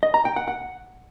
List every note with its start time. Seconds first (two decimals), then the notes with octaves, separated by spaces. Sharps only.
0.03 D#5
0.14 A#5
0.25 G5
0.36 F#5
0.48 F#5